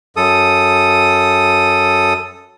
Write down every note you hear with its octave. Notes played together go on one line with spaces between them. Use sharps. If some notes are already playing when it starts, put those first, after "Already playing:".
F#2 A4 D#6